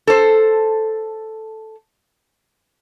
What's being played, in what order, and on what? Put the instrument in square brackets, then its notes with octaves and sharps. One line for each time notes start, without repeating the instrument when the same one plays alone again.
[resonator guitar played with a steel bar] A4 C5